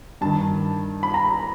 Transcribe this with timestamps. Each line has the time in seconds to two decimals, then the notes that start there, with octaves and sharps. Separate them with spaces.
0.21 G2 D#3 A5
1.03 B5
1.14 A#5